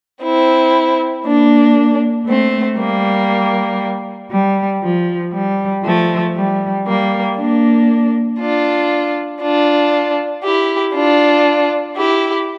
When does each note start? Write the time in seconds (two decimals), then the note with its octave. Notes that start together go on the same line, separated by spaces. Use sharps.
0.24 C4 E4
1.26 A#3 D4
2.28 A3 C4
2.79 G3 A#3
4.32 G3
4.83 F3
5.34 G3
5.84 F3 A3
6.36 G3
6.87 G3 A#3
7.38 A#3 D4
8.40 D4 F4
9.42 D4 F4
10.44 E4 G4
10.95 D4 F4
11.97 E4 G4